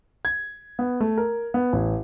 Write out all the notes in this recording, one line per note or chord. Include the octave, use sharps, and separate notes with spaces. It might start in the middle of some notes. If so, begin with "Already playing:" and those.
G#6
B3
A3
A#4
B3
A1